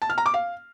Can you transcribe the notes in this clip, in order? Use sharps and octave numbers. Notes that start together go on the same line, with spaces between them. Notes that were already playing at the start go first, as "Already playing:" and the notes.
A5
F6
A#5
D6
F5